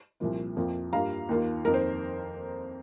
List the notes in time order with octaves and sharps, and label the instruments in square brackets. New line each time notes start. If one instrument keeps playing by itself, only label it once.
[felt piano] C2 A#2 F3 A#3 F4
F2 F3 A#3 F4
G2 G3 A#3 F4 F5 A#5
D#2 D#3 A#3 F4
F2 D#3 A#3 A#4
C5